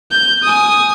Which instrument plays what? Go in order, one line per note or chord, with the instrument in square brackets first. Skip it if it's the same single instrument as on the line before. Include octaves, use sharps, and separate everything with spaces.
[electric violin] G6
G#5 D#6